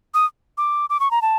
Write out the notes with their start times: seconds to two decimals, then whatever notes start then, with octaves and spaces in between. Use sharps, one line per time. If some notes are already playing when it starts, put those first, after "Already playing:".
0.14 D#6
0.58 D6
0.90 D6
1.00 C#6
1.11 A#5
1.22 A5